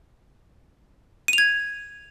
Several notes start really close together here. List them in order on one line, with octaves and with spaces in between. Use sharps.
D#7 F7 G#6